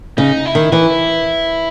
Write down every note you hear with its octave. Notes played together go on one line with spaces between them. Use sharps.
C#3 D#4
E4
D#3
E3 E4